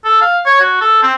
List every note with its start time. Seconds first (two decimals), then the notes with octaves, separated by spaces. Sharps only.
0.05 A4
0.21 F5
0.46 C#5
0.60 F#4
0.81 A4
1.03 C4